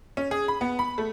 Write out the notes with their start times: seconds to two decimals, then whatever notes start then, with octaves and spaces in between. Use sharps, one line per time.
0.17 C#4
0.31 G#4
0.48 B5
0.61 B3
0.79 B5
0.98 A3